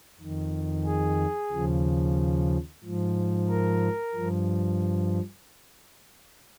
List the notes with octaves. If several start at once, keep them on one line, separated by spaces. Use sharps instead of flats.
F2 D#3
G#4
D#2 C#3 F3
G#2 F3
A#4
G2 F3